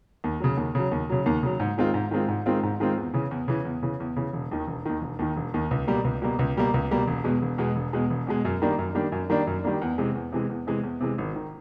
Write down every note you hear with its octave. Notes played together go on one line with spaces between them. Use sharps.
D#2
C#3 F#3
D#2
C#3 F#3
D#2
C#3 F#3
D#2
C#3 F#3
G#2
D#3 G#3 C4 F4
G#2
D#3 G#3 C4 F4
G#2
D#3 G#3 C4 F4
G#2
D#3 G#3 C4 F4
E2
C#3 E3
E2
C#3 E3
E2
C#3 E3
E2
C#3 E3
E1
D#2 D#3
E1
D#2 D#3
E1
D#2 D#3
E1
D#2 D#3
C#2
B2 G3 A#3
C#2
B2 G3 A#3
C#2
B2 G3 A#3
C#2
B2 G3 A#3
E1
E2 B2 G#3
E1
E2 B2 G#3
E1
E2 B2 G#3
E1
E2 B2 G#3
F#2
D#3 G3 A#3 D4
F#2
D#3 G3 A#3 D4
F#2
D#3 G3 A#3 D4
F#2
D#3 G3 A#3 D4
E2
C3 E3 G#3
E2
C3 E3 G#3
E2
C3 E3 G#3
E2
C3 E3 G#3
G#1
D#3